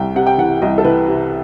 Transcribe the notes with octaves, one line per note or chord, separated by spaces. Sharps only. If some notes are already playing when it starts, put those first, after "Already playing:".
Already playing: C2 C3 G5
C3 F#5
G5
E3 F#5
C2 D#5
A4
E3 B4
C3